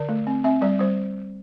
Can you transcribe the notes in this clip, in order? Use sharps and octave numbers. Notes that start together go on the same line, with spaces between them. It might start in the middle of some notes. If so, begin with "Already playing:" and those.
Already playing: D3 D5
A3
C4
C4 E5
G3 D5
G3 C5